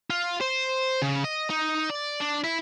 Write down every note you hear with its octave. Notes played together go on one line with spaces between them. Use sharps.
F4
C5
C#3
D#5
D#4
D5
D4
E4